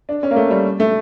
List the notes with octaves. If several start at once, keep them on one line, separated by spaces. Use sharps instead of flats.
D4
C#4
A#3
A3
G3
A3